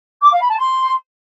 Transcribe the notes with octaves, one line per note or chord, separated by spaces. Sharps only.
D6
F5
B5
A5
C6